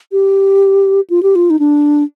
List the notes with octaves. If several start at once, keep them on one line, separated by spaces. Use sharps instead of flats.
G4
F4
G4
F4
D#4
D4